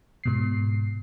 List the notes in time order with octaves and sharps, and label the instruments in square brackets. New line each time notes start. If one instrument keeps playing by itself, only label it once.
[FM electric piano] G#2 B2 C7